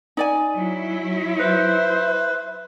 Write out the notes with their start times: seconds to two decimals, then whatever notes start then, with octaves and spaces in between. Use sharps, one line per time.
0.17 D#4 D5 G#5
0.56 F#3 E4
1.40 B4 C5 E5